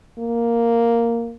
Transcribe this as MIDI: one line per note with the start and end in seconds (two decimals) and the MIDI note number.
0.19 1.35 58